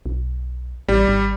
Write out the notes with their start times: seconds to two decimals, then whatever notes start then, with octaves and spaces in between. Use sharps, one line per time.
0.06 B1
0.88 A1 G3
1.08 G#1